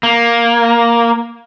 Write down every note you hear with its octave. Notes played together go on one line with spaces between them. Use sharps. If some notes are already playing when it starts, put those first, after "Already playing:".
A#3